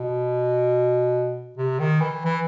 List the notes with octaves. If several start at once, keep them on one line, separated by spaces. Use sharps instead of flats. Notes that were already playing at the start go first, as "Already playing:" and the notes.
Already playing: B2
C3
D#3
E3
E3